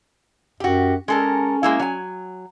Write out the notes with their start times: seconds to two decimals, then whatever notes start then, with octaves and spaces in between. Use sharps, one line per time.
0.60 F#2 F#4 G4
1.08 G#3 C#4 A4 A#4
1.63 G#3 A#3 E4
1.80 F#3 G#5